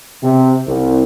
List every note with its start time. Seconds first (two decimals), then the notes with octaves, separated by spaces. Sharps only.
0.22 C3
0.67 C2